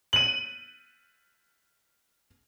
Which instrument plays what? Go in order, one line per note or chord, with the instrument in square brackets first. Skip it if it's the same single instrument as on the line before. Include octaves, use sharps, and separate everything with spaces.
[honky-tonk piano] D#7 F#7